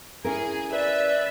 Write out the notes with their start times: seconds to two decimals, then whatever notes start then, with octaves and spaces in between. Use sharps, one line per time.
0.24 C#4 E4 G#4 A#4
0.72 B4 D5 E5